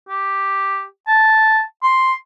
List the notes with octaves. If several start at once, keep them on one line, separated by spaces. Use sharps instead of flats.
G4
A5
C6